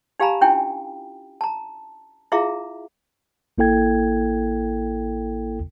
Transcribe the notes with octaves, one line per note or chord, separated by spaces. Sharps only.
D#4 G4 F5 G#5 A#5 B5
C#4 D4 E4 F4 G5 G#5
A5 A#5
E4 F4 G#4 E5 F5 A#5
A1 A#3 E4 A4 G5 G#6